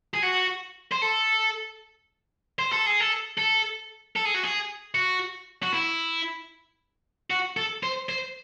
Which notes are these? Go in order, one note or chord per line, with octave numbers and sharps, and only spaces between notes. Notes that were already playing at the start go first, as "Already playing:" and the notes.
G#4
F#4
C5
A4
C5
A4
G#4
A4
A4
A4
G#4
F#4
G#4
F#4
F#4
E4
F#4
A4
C5
C5